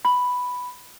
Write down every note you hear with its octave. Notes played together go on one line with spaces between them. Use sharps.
B5